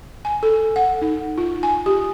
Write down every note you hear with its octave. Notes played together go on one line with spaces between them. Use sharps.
G#5
A4
F#5
D#4
F4
G#5
G4